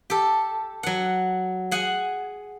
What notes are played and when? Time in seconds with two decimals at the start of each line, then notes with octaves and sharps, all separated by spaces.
0.10 G4 A4
0.83 F#3 F#5
1.71 G#4 F#5 G#5